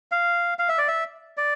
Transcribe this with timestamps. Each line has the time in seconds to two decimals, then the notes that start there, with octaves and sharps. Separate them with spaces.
0.12 F5
0.59 F5
0.69 E5
0.78 D5
0.88 E5
1.37 D5